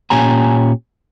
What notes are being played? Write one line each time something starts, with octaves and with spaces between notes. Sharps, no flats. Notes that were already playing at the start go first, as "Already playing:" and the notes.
A#2 C#4 G4 G#5 A#5